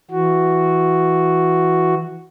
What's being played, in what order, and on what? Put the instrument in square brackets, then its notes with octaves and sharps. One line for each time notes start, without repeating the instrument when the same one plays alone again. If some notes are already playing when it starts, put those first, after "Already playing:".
[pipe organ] E3 F#4